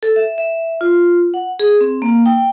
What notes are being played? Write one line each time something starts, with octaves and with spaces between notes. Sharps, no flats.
A4
E5
E5
F4
F#5
G#4
C4
A#3
G5